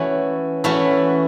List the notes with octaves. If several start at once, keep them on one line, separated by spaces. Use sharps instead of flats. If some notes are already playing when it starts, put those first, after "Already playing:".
Already playing: E3 A3 C#4 F#4
E3 A3 C#4 F#4